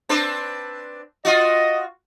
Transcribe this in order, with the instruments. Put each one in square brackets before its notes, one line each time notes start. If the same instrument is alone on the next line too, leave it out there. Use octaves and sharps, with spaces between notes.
[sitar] C4 D4 B4
[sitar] F4 F#4 [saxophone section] D#5